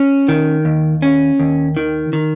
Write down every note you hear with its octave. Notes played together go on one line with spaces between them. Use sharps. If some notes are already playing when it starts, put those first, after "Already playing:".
Already playing: C#4
D#3
D#2
C#4
D#2
D#3
D#3